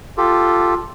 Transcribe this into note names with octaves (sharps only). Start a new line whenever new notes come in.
F4 G4 A4